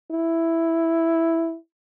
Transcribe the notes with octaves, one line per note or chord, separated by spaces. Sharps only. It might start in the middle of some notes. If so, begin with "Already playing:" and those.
E4